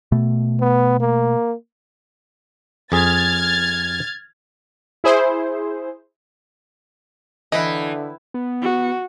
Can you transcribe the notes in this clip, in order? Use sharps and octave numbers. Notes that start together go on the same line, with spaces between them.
B2 A3
B3
A#3
F2 G#4 F6 G#6 A6
E4 G#4 C5
D3 E3 E4 B4 D#5 G5
B3
F#4